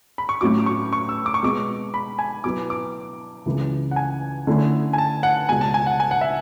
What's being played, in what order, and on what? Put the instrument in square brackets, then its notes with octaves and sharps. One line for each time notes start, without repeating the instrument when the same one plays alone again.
[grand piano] B5
C#6
[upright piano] A2 F#3 C#4 F#4 [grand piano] D6
[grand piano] D6
C#6
C#6
E6
D6
C#6
[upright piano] B2 G#3 B3 [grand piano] D6
[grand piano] B5
G#5
[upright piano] B2 F#3 B3 E4 B4 [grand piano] D6
[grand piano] D6
[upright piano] C#2 C#3 E3
[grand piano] F#5
G#5
[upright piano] D3 A3 C#4 E4
[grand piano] G#5
A5
F#5
[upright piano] C#2 B2 G#3 [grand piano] G#5
[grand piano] A5
G#5
F#5
G#5
F#5
E5